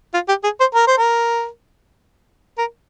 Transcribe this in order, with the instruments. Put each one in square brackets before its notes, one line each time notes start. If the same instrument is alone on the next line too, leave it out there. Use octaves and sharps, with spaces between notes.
[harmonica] F4
G4
G#4
C5
A#4
C5
A#4
A#4